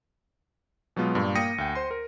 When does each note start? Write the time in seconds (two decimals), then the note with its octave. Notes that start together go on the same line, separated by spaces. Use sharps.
0.96 B2 F#3 G#3 B3 F4
1.15 G2 A#2
1.35 A#3 G5 D#6 A#6 C#7 D#7
1.58 D2 G5
1.75 C5 C6
1.91 A#4